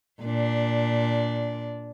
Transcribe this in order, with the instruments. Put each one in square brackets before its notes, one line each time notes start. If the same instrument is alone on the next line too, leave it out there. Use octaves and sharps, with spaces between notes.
[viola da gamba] A#2 D4